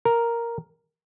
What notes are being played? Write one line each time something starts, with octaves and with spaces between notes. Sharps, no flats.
A#4